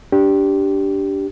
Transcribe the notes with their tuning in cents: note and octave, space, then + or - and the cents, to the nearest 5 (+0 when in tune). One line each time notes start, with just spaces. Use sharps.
D4 -15 G4 -10